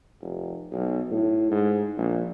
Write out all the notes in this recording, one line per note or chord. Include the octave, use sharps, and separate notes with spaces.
F1
B1
A2
G#2
A#1